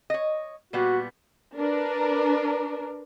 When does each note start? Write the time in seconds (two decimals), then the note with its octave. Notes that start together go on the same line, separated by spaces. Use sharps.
0.10 C#5 D#5
0.73 A#2 G3 B3 F#4
1.56 D4 A#4 B4